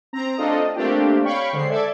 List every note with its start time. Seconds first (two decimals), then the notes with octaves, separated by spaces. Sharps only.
0.13 C4 A#5
0.38 A3 C4 D4 F4 A4 D#5
0.75 A3 A#3 C4 D4 F4 G4
1.25 C#5 F5 G5 B5 C#6
1.53 D3 G#3 C5 C7
1.69 A4 D5 E5 G#6